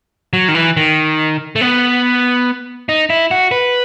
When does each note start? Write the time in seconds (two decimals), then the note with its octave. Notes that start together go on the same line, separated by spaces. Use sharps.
0.33 F#3
0.48 D#3
0.55 E3
0.77 D#3
1.56 A3
1.61 B3
2.89 D#4
3.10 E4
3.31 F#4
3.51 B4